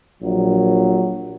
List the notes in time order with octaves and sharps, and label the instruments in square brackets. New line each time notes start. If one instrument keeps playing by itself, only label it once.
[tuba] A#1 [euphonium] F#3